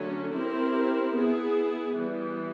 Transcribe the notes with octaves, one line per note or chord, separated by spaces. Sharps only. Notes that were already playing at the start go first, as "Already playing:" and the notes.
Already playing: D3 F#3 A3 C#4
C4 E4 G4 A#4
B3 E4 G#4
E3 G3 B3